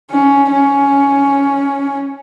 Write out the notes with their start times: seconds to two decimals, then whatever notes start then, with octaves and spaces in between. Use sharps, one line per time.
0.11 C#4
0.52 C#4